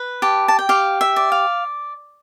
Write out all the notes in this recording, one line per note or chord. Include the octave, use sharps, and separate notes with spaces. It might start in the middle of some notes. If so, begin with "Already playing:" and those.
Already playing: B4
G4 A5
A5
G5
G4 F5
E5
D5
F5